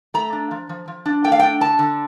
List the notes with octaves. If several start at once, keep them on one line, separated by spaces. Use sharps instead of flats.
A3 A#5
D4
F3
F3
F3
D4
A3 G5
F5
D4 G5
D3 A5
D3